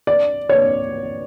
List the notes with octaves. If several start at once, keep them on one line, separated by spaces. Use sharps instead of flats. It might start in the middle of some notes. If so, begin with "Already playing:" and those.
D5
C#5